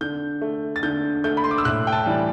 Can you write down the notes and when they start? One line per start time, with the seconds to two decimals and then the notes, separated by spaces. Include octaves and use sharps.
0.01 D3 G6
0.42 A3
0.76 A6
0.83 D3 G6
1.24 A3 G6
1.37 B5
1.44 C6
1.51 D6
1.58 E6
1.65 A2 F#6
1.87 G5
1.92 A5
2.06 E3 G3